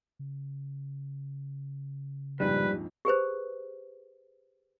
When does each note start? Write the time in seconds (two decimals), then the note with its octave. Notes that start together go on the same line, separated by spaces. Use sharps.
0.19 C#3
2.40 A#1 F2 G#2 G3 B4
3.05 G4 G#4 B4 C5